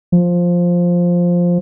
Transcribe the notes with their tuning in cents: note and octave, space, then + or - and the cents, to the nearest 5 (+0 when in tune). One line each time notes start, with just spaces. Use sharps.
F3 +5